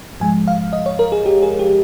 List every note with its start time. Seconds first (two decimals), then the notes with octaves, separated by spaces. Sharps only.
0.20 G#2 F3 G#3 G#5
0.48 F5
0.73 D#5
0.86 C#5
0.99 A#4
1.12 G#4
1.26 G4
1.43 G#4
1.59 G4